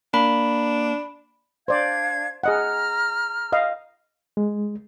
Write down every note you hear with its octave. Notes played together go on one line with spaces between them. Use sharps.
A#3 D4 B5
D4 C5 D5 F5 G#6
G#4 D#5 F#5 A#5 F6
D#5 F5
G#3